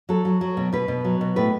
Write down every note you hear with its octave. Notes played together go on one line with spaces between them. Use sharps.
F#3 A4
F#3
F#3
B2
B2 B4
B2
F#3
B2
A2 B4